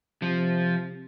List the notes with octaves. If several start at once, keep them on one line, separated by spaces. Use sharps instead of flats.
C3 F3